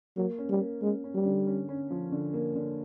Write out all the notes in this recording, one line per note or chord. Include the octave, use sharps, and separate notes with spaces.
F#3 A#3
C#4
G3
A#3
G#3 C#4
C#4
G3
D3
C#4
C#4
F3
D3
A#3
D3